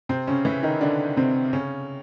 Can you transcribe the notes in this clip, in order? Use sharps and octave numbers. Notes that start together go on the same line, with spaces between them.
C3 C4
C#3 C#4
E3 E4
D#3 D#4
D3 D4
C3 C4
C#3 C#4